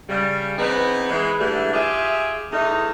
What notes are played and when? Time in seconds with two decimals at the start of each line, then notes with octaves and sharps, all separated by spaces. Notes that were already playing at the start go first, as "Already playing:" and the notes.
0.09 C#3 G3
0.58 E3 B3 C4 D#4 G#4 B4
1.09 E3 G#3
1.38 G#2 D3 E3 G3 A3
1.72 F4 G4 G#4 D#5 E5
2.51 E2 A3 D#4